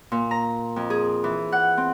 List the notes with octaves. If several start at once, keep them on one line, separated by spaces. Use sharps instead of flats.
A#2
A#5
F2
G#4
E3
F#5
C4